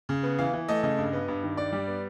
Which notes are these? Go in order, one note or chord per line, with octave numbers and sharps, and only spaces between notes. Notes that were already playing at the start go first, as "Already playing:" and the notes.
C#3
B3
E3 F5
E3
A3 D#5
C#3 D#5
G2
B3
G2
D#3
G2 D5
G3
B3